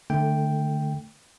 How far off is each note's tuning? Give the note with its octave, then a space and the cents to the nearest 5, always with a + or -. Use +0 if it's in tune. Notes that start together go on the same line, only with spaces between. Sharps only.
D3 +25 A3 +0 G5 +0